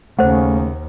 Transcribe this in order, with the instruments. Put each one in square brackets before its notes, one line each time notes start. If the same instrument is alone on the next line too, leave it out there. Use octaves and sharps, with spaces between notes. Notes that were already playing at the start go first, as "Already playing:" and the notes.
[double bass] D#2 [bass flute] C#3 [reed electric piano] A3 [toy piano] C5 F#5